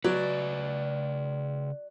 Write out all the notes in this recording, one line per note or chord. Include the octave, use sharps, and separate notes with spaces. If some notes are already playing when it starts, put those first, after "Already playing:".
C#3 F#3 B4 D5